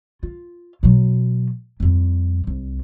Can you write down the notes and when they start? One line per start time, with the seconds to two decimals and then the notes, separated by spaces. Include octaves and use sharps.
0.23 F4
0.83 B2 F#3
1.80 F2 G3
2.47 C2